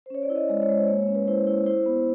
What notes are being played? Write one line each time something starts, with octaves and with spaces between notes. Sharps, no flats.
C5
C#4 C#5
D5
E4
D#5
G#3 D5
C#5
G#3
C5
A#3 C#5
C#5
C#4
B4
E4 C5
E4 C#5
E4 C5
B3